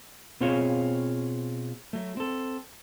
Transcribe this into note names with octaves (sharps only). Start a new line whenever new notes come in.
B2 C4 F4 G#4 C#5 F5
F#3 A3
C4 A4